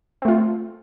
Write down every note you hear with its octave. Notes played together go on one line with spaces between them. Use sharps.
A3 C4 F4